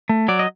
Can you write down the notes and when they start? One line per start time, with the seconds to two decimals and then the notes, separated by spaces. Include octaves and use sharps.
0.09 A3
0.28 F#3 D5
0.39 D#5